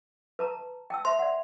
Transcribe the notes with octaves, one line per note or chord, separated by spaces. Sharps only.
B4 A5 A#5
G5 A5 E6
C5 E5 C6
D5 F#5